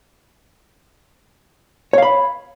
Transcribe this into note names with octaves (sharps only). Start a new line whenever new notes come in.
C#5 F5 B5